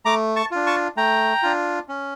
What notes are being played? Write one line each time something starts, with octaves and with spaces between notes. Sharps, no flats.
A3 A#5 D6
A5 C#6
D4 F4
A5 C#6
A3 G5 A#5
D4 F4
C#4